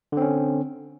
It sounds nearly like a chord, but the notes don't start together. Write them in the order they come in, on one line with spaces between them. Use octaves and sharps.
D3 C4 C#4